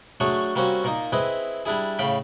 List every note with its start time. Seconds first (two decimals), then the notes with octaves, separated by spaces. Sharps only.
0.20 F#3 A3 D4 G#4 C#5
0.56 G3 A#3 C4 C#4 F#4
0.84 A#2 A#3 D#4
1.12 C4 E4 G#4 B4 D#5
1.66 G3 D4 E4 G#4
1.99 A2 C#3 F5 G5 B5